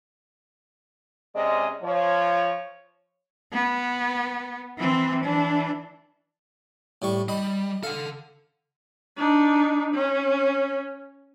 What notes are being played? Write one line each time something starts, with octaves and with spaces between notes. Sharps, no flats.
C3 G#3 C#4 D5 D#5
F3 C#5
B3
E3 C4
E3 D4
A2 G3 C#6
G3 D#5 B5
A4 F5 F#5
D4 D#4
C#4